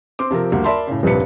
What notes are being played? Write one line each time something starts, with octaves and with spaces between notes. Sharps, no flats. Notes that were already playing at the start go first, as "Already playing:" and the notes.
C4 C6 D6
C3 F3 C4 A#4
D2 G3 A#3
A#4 D5 E5 A5 B5 C6
A2 C#3
D#1 A#1 G2 C3 B4 C#7